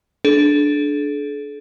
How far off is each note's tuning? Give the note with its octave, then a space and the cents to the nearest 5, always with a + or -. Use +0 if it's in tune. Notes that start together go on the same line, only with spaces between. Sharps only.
D4 +0 A4 -45